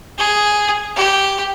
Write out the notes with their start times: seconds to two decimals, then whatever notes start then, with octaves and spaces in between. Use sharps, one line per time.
0.19 G#4
0.96 G4